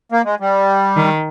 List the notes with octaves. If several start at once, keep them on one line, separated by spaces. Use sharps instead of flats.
A#3
G#3
G3
D#3